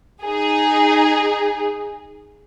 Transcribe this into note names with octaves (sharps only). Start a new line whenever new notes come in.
D#4 G#4